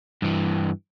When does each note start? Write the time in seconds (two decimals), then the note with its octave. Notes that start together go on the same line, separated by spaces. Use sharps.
0.22 G2 E3